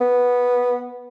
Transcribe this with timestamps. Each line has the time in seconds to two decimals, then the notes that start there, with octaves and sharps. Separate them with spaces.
0.01 B3